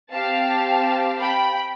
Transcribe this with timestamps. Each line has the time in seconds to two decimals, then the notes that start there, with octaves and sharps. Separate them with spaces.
0.12 C4 G4 F5 A5
1.20 G5 B5